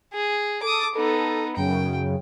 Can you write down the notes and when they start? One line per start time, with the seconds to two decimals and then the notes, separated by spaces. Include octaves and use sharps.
0.13 G#4
0.63 A4 D6 D#6
0.95 B3 D#4 A4
1.57 F#2 C#3 G5